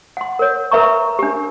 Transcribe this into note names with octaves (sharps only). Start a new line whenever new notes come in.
F#5 C6
A#4 C#5
A#4 B4 E5 A#5 C#6
D4 G4